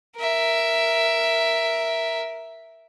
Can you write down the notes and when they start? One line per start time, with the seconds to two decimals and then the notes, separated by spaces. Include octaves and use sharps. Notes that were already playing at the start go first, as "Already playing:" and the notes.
0.17 A#4 E5